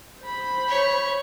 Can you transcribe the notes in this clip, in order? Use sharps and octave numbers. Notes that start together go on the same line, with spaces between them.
C5 B5
C#5